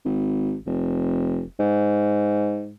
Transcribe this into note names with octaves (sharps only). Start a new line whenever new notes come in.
G#1
F1
G#2